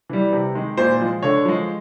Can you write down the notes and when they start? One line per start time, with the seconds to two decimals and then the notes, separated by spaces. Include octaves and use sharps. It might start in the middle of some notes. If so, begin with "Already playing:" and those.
0.10 E3 G3
0.32 C3
0.55 D#3 G#3
0.77 A#2 C5
1.00 F3 G#3
1.23 D3 C#5
1.45 F3 G#3